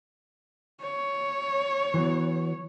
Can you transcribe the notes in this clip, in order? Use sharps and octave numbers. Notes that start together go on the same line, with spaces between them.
C#5
E3 F#3 B3